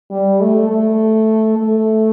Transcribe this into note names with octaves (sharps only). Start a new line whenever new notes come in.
G3
A3
A3
A3